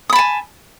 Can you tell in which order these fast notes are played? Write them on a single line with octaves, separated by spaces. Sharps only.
D#6 B5 A5 G#5